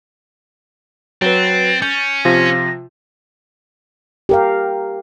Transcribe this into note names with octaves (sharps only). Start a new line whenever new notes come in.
F#3 C4 B4 A6
C#4 G6
C3 F3 F4 A#6
G4 A#4 F5